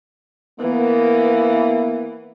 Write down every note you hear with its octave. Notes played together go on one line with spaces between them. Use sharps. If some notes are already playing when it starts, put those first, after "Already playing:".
E3 A#3 B3